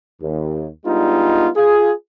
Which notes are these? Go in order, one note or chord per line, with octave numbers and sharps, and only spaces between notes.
D#2
G3 G#3 B3 D4 D#4 F4
F4 G#4